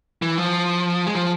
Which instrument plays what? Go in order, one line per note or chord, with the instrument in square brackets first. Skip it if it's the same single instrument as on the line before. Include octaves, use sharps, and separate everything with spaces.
[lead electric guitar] E3
F3
G#3
F3